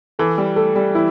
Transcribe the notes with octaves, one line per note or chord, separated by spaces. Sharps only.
E3 A4
G3
A3 A4
G3
E3 E4